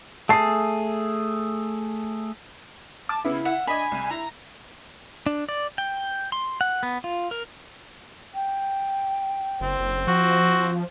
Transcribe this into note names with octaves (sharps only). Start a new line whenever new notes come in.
A3 G#4 A5 C7
A5 D6
C#3 B3 E4
E5 F#5
D4 D#5 G#5 B5
C2
E4 A#5
D4
D5
G5
C6
F#5
B3
F4
A#4
G5
F#1 C4
F#1
F3 F#4